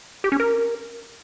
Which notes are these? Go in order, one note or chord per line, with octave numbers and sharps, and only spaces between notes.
G4
C#4
A#4